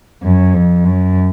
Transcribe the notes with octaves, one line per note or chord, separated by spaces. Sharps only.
F#2
F2
F#2